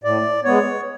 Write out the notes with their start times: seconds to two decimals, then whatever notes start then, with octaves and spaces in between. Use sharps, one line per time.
0.04 A2 D5
0.45 G#3 B3 C#5